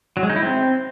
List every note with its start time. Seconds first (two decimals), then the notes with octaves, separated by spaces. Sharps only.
0.17 F#3
0.23 G#3
0.30 D#4
0.36 E4
0.42 C4